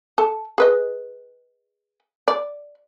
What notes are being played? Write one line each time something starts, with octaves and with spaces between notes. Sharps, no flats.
A4 A5
G#4 B4 D#5
D5